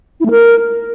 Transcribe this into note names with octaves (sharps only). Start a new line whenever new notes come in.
E4
A3
A#4